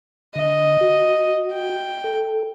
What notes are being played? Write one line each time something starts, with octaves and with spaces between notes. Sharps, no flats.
D3 D#5
F#4
G5
A4